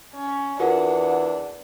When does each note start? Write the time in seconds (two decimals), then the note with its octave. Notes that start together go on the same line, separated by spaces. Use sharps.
0.15 C#4
0.60 E2 D4 F4 F#4 A#4 F#5